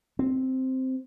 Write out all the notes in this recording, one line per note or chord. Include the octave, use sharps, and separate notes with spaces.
C4